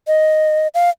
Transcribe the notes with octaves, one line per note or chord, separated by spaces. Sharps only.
D#5
F5